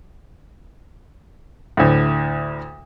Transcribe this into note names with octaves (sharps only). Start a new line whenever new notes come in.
D2 A2